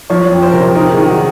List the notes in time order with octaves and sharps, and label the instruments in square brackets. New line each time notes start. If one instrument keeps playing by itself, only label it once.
[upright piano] F3 [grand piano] C#5
[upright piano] F2
[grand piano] C5
[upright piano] C3 [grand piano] A#4
[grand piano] C5
[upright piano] D#4 [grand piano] A#4
[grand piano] G#4
[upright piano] D#3
[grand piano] F#4